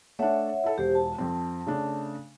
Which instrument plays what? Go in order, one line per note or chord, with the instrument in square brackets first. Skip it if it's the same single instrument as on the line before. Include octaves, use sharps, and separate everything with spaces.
[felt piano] A3 D4 [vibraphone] C#5 E5 F#5
[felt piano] E4 A4
[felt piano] E1 [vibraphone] G4 C5
[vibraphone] A5
[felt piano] F2 C4
C#3 A3 D4